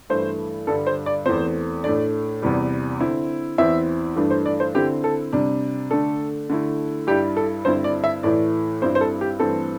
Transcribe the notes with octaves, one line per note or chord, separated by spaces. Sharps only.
G2 E3 A3 E4 C5
G2 D3 G3 A4
C5
D5
E2 E3 A3 C4 C5
A2 A3 D4 D5
E2 C3 E3 G3
D3 C4 E4
E2 E3 C4 E4 E5
G2 E3 A3 D4
C5
D5
C5
D3 C4 E4 G4
A4
C3 G3 D4
D3 A3 D4 A4
D3 A3 E4
G2 G3 E4 G4
A4
G2 D3 C4 E4 C5
D5
E5
A2 E3 A3 E4 D5
G2 G3 C4 E4 C5
C5
A4
G4
G2 E3 A3 C4 A4